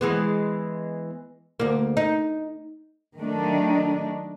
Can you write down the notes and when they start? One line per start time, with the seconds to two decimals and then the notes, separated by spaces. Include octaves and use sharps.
0.01 E3 G#3 B3
1.60 D2 A#3
1.97 D#4
3.20 D#3 F#3 A3 D4 D#4